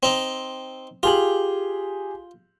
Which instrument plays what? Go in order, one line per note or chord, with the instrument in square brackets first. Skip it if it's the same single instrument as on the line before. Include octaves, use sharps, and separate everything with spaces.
[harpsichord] C4 D#4
[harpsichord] F4 [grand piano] G4 G#4 F#7